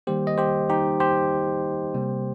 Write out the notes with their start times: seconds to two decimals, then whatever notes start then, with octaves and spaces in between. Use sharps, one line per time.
0.07 D#3 G3 A#3 G4 C5
0.27 D#5
0.38 G4 C5
0.70 D#4 G4
1.00 G4 C5
1.94 C3 G3 A#3